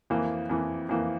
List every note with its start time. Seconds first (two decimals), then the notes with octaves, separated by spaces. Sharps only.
0.10 F2 E3 A#3
0.50 F2 E3 A#3
0.89 F2 E3 A#3